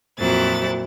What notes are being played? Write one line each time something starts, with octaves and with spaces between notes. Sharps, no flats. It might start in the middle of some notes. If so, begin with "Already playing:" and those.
F2 A#2 F#3 E4 A6